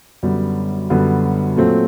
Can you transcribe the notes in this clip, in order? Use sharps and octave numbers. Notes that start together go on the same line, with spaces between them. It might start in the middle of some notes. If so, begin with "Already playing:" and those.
F#2 D3 G3 B3
F#2 D3 G3 B3
A#2 F#3 A3 C4